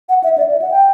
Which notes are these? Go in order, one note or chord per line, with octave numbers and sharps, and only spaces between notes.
F#5
E5
D5
E5
F#5
G5